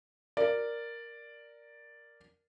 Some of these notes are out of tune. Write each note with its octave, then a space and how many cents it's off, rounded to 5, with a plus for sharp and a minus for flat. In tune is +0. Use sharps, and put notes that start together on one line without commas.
A#4 +0 D5 +0